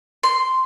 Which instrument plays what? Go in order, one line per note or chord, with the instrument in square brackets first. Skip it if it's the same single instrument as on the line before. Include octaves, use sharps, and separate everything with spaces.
[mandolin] C6